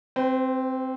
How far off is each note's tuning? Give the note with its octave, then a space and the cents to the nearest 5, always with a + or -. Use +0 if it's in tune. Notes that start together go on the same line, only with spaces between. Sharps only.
C4 +0 C5 -45